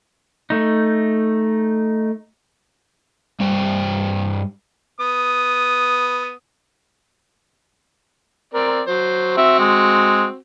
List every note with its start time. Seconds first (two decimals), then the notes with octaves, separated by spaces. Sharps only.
0.50 A3 D#4
3.40 G2 G3 C5 G5
5.00 B3 D#6
8.54 C4 A#4 D5
8.87 F#3 C5
9.37 C4 F#4 E5
9.59 G#3